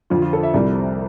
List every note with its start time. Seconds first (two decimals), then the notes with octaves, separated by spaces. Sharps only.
0.10 F2 D3 F3 F4
0.22 F4
0.33 A4
0.43 E5
0.54 C2 C3 G3 D5